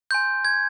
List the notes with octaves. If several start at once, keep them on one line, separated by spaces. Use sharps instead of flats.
G#5 C6 G6
G#6